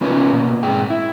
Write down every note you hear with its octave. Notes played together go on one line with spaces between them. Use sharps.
B3 C#4 F4 B4 C#5
B2 A#3
G#2 G#4 G5
E4